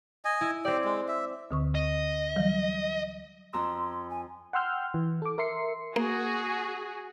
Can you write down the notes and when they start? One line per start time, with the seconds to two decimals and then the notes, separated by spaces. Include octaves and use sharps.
0.25 D#5 G#5
0.41 E4
0.65 C4 G4 D5
0.85 G#3
1.08 E5
1.51 D2 D3 C#6
1.75 D#5
2.36 E3 F#3 G3
3.53 F2 A#5 C6 E6
4.10 G#5
4.53 F#5 G5 C6 E6 F6 G6
4.94 E3
5.22 A4 D6
5.38 A#4 E5 C6 C7 C#7
5.96 A#3 F#4 G#4